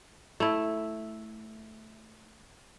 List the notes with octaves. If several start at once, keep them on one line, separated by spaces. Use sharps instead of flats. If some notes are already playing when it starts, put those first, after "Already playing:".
A3 E4